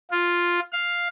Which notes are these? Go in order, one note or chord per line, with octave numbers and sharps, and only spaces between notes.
F4
F5